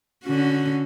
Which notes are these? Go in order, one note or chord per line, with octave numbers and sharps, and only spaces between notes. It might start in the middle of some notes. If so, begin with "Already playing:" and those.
D3 C#4 F#4